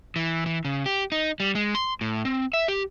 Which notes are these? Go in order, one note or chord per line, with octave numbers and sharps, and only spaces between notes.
E3
E3
C#3
G4
D#4
G3
G#3
C6
A2
C4
E5
G4